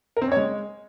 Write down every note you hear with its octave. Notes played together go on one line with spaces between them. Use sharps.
A#4
C4
C#4
C#5
G#3